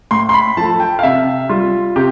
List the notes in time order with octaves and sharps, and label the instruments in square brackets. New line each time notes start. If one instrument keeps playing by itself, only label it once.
[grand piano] A2 C6
C6
B5
F3 A3 A5
G5
F5
C3 E5
G3 F4
C3 G4